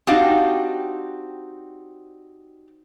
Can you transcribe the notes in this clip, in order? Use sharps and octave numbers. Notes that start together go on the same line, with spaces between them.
C4 D4 D#4 F#4 G4 F5